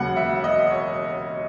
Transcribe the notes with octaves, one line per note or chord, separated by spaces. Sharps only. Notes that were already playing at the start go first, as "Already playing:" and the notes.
Already playing: E1 D#2 C#3 F#3 F#5
E5
E5
D#5
C#5